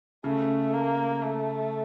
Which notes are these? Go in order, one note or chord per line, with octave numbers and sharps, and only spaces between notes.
C#3 A3
A#3
A3